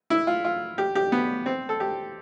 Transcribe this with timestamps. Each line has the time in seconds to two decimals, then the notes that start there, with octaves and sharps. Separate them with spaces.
0.10 E4
0.27 F4
0.44 F4
0.78 G4
0.95 G4
1.12 B3
1.46 C4
1.69 A4
1.80 G4